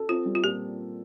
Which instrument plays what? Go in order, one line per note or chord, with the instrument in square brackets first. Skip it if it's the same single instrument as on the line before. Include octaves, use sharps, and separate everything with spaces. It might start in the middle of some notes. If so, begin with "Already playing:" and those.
Already playing: [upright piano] A4
[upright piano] C4 [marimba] F4
[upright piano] G3
[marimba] F4
[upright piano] A#2 [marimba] G4